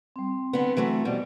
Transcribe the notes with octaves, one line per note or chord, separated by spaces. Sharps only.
G3 C4
D3 B3
E3 F#3 A3
F2 B2 G3